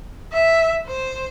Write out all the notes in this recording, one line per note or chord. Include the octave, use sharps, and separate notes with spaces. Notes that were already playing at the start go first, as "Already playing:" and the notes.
E5
C5